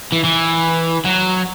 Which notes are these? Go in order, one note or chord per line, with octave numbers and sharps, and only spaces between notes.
E3
E3
F#3